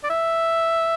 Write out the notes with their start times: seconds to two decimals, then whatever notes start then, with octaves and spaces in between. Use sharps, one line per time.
0.04 D5
0.10 E5